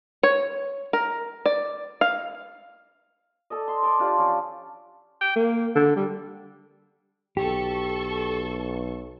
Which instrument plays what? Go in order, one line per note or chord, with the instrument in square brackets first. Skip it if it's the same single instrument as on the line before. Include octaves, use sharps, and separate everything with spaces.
[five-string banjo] C#5
A#4
D5
F5
[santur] A4 D5 D#5
C6
D5 A5 C6 D6
D4 F4 G4 D5
F3 C#4
[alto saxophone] G5
A#3
D3
G3
[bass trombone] B1 [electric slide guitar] G4 [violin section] A4 C#6